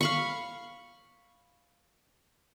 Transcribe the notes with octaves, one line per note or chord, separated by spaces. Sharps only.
F5 B5 C#6